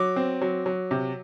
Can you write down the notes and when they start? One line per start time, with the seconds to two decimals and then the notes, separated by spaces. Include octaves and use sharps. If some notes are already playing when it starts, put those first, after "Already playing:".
Already playing: F#3 D6
0.16 C4
0.41 F#3
0.66 F#3
0.91 C3